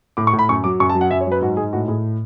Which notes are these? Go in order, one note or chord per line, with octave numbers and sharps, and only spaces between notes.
A2 D6
C#6
A2
B5
F#2 C#6
F#3 D6
F#2 C#6
A5
F#3
F#5
F#2 E5
C#5
F#3 B4
G#2 F#4
G#2 G#4
A2 F#4
A2 G#4